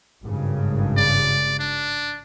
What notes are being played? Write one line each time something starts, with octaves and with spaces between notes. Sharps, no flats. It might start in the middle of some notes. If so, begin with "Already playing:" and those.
G#1 G2 C#3
D5
D4